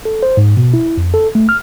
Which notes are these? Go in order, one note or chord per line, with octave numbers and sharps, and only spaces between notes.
A4
C5
G#2
B2
E4
F2
A4
A3
F6